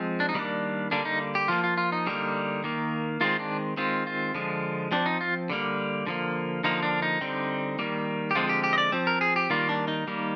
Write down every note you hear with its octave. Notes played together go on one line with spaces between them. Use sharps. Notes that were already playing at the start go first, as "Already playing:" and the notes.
Already playing: F3 G#3 C4
D4
D#4
D#3 G3 A#3 D4
D3 G3 A#3 D4
D#4
G4
F3 A#3 F4
F4
F4
D#4
D3 G3 A#3
D#3 A#3
D#3 G#3 C4 F4
D4
D#3 G#3 C4 F4
F4
D3 F3 G#3
F3 C4 D4
D#4
F4
D3 G3 A#3
D3 F3 A#3
D3 F3 A#3 D#4
D4
D#4
D3 G3 C4
D#3 G3 A#3
G4
D3 F3 G#3 C4 F4
G4
G4
D#5
D5
F3 C4
A#4
G#4
G4
D#3 G3 A#3 F4
D4
D#4
D#3 G3 A#3